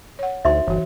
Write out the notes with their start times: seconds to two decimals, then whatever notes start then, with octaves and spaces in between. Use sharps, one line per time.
0.19 C#5 F#5
0.45 D2 D#4 F#4 C5 E5 C6
0.67 G1 E3 F#4